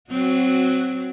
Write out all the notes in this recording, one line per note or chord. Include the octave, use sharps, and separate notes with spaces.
F#3 C4 F#4